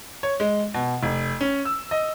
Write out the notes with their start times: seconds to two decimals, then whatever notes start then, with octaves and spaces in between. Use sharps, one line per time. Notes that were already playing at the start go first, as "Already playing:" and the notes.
0.23 C#5
0.40 G#3
0.74 B2
1.03 F1
1.41 C#4
1.65 E6
1.91 D#5